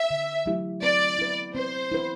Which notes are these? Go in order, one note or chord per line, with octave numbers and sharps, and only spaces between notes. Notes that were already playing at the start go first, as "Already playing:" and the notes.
Already playing: E5
D3
F#3 A3 E4 G4
C4 D5
E4 B4
C4 C5
E4 B4